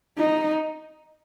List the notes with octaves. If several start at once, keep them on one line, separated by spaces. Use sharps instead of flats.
D#4